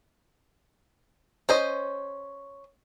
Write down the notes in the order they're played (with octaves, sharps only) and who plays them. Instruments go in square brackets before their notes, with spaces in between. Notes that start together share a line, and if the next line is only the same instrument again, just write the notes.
[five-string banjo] C#4 C5 D#5